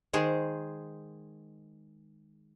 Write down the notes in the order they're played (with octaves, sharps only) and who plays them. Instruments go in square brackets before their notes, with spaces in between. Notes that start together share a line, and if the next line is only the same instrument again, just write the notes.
[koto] D#3 G#3 G#4 C5